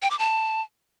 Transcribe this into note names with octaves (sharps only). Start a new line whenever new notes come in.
G5
D6
A5